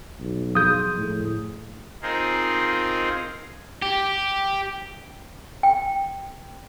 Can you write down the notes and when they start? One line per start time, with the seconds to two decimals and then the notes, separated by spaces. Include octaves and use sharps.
0.20 B1
0.55 F3 G#4 D#6 G6
0.97 A2
2.02 C4 D#4 F4 G#4 A#4 C5
3.82 G4
5.63 G5